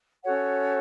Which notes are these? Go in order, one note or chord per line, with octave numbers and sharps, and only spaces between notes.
C#4 F#4 A4 C#5 F#5